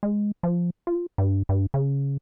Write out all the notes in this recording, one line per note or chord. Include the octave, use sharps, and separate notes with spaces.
G#3
F3
F4
G2
G2
C#3